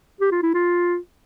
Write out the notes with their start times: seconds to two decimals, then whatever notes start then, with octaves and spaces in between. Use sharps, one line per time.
0.20 G4
0.32 F4
0.43 E4
0.54 F4